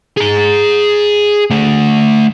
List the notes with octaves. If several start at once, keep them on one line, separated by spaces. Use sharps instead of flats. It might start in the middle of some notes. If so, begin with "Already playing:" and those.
G#4 A#5
A3 D4